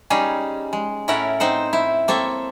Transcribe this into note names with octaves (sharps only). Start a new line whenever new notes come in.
G3 C#4 D#4 G#4
G#3
A2 C#4 E4 A#4 F#5
C4 D#4 C5 F#5
E4
A#3 C4 A4 C#5 E5